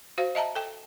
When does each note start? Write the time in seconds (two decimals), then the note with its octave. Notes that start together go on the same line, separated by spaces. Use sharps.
0.18 F#4 C5 F5
0.35 D#5 E5 A5 A#5
0.55 A4 G5